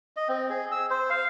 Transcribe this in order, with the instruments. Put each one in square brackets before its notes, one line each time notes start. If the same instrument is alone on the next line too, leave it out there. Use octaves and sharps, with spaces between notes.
[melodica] D#5
C4
G#4
E6
C5
F5